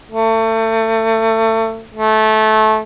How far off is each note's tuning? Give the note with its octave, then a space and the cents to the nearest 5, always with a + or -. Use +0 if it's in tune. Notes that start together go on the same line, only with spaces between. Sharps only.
A3 +30
A3 -20